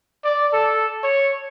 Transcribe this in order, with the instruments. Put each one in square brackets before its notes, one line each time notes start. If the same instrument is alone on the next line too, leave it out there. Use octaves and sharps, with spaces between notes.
[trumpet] D5
A4
C#5